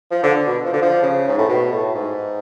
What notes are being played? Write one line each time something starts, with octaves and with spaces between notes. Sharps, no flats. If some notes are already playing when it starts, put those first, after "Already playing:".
F3
D3
B2
F3
D3
F3
C#3
G#2
A2
B2
A2
G#2